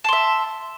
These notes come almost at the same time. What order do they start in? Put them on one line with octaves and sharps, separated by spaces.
A5 C6 E5